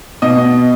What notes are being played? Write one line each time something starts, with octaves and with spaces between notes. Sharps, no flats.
B2 D#5